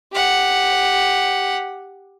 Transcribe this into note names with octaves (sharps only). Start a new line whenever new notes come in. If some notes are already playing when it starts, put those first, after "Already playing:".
G4 F#5